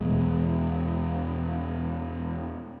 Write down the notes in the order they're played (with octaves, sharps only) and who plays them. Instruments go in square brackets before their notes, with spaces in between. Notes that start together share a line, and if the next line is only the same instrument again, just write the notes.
[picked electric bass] E2 B2 G#3